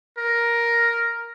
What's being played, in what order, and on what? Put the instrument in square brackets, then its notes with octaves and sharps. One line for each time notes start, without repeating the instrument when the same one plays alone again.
[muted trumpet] A#4